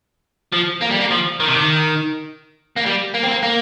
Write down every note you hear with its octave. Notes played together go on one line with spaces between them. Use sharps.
F3
A#3
G3
A#3
F3
D#3
C3
D#3
A#3
G3
A#3
C4
A#3
A#3